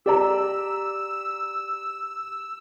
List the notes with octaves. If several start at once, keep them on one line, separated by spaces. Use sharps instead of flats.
G4 D5 A#5 E6